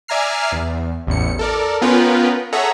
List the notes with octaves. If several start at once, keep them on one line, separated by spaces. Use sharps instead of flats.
D5 E5 G#5 A#5 F6 C7
E2
A1 E2 C#7
A4 A#4 D5
B3 C#4 F4 A#4 B4 G5
G#4 A4 C#5 E5 F#5 A#5